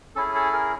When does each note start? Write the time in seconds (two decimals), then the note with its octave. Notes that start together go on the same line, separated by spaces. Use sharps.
0.16 C#4 E4 G#4 A4
0.35 A4
0.53 G#4 A#4